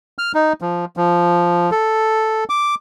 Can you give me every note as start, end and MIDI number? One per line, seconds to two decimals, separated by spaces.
0.18 0.32 89
0.35 0.53 63
0.61 0.85 53
0.97 1.70 53
1.72 2.44 69
2.50 2.75 86